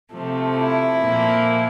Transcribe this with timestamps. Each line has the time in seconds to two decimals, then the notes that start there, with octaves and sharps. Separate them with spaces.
0.12 C3 F3 A3
0.56 E4
0.99 A#2 F3 A#3